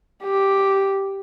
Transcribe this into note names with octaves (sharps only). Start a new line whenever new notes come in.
G4